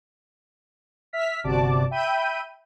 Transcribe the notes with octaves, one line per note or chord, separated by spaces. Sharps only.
E5 F6 B6
G1 C3 F#4 D5 A5 D6
E5 G5 B5 G6 D#7